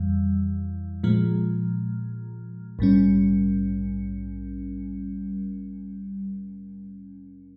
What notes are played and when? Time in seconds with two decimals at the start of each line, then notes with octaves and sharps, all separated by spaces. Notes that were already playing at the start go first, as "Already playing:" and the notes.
Already playing: F2 E3 G3
1.04 A#2 F3 G#3
2.79 A#1 G#2 G3 C#4